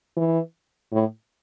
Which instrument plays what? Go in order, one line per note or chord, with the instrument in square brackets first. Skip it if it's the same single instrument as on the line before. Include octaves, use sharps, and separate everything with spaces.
[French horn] E3
A2